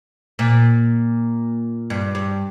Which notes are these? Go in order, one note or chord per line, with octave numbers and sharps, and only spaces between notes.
A#2
G2
G2